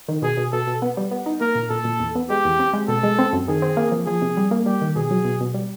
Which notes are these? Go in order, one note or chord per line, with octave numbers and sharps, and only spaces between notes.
D#3
B2 G#4
B2
B2 A4
B2
B3
G3
B3
D#4
A#3 A#4
A#2
A#2 A4
A#2
E2
B3
G#3 G4
E2
C4
G#3
B2 A4
G#3
C4
F#2
D#3 G#4
C4
A#3
F3
F3 G#4
C3
G3
A#3
G3 G4
D#3
B2 G#4
F#3
B2
B2
G3